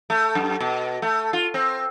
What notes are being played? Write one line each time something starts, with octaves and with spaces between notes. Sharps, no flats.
A3
F#2
B2
A3
F4
C4